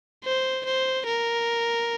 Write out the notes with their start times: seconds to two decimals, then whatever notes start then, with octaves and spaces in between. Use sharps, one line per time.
0.24 C5
0.65 C5
1.06 A#4